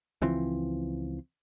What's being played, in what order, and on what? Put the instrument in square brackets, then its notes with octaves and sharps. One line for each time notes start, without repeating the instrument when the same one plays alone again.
[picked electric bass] C#2 E3 F3 C4